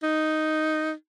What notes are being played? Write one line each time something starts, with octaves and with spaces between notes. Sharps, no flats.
D#4